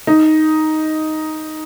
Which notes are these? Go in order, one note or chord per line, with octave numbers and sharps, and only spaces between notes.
D#4